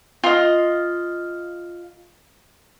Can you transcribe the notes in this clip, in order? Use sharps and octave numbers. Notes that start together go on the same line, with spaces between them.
F4 D#5